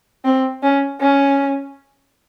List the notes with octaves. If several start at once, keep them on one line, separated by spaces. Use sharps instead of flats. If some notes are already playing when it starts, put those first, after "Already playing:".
C4
C#4
C#4